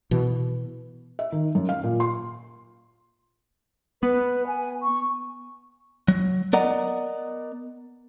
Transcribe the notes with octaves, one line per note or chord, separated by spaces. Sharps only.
B2 E3
E5
D#3
F#2
F5
A#2
C6
B3 B4
G#5
C#6
F#3
B3 A#4 D5 D#5 F#5 A#5